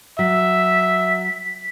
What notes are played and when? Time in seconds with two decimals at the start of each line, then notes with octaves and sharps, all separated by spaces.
0.19 F#3 E5 B6